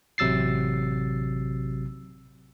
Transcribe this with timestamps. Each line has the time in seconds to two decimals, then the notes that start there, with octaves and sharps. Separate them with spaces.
0.18 A1 C3 F#3 E6 A6 C7